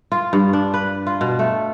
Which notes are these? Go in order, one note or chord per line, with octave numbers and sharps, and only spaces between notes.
F4
G2
D4
B4
F4
B2
A3